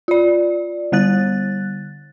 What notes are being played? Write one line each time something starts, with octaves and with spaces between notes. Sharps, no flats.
F4 D5
D3 G3 F#6 A6